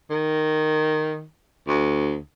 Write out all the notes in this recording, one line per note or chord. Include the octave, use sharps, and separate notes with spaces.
D#3
D2